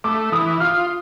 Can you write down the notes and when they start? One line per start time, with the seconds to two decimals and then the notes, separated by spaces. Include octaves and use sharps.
0.04 A3 D6
0.32 E3 D#6
0.60 F4 F6